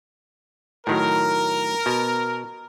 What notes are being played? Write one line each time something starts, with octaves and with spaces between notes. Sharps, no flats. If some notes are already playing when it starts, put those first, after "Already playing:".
A2 D#3 F#3 A#4
B2